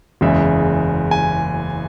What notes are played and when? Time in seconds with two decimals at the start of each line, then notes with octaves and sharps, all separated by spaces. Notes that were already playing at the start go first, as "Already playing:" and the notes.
0.21 F#1 E2 C#3 G#3 E5
1.11 G#5